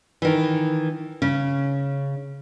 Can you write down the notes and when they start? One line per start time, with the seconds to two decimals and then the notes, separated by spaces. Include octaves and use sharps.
0.22 D#3 E3
1.22 C#3 C#4